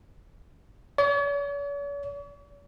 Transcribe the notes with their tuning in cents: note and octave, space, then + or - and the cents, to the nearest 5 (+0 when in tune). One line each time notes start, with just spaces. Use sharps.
C#5 +45